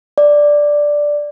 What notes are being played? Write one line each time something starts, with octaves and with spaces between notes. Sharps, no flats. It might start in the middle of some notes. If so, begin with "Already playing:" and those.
D5